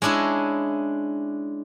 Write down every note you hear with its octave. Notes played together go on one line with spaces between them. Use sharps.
G#3 C#4 D4 E4 D#5